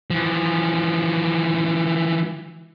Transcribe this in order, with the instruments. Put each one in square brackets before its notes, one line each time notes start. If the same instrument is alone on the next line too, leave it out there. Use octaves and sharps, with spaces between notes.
[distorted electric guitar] E3 F3